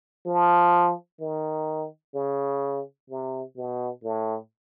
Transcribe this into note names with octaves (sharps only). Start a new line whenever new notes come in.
F3
D#3
C#3
C3
B2
A2